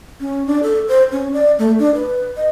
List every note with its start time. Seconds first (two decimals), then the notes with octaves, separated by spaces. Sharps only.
0.20 C#4
0.46 D4
0.63 A4
0.88 C5
1.12 C#4
1.33 D5
1.59 A3
1.79 D4
1.95 B4
2.37 D#5